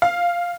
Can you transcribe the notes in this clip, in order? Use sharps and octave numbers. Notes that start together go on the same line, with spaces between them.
F5